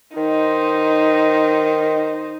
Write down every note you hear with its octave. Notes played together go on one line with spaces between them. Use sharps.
D#3 D#4 C5